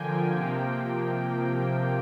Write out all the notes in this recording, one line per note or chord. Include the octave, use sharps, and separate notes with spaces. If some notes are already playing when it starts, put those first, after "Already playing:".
Already playing: D3 F3 A#3 G5 G#5
C3 F3 A#3